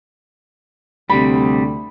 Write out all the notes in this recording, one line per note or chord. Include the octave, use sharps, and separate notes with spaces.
D2 C3 G3 B5